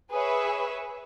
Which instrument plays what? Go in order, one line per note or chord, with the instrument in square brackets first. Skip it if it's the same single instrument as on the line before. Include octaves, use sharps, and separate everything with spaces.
[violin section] G#4 B4 C#5 E5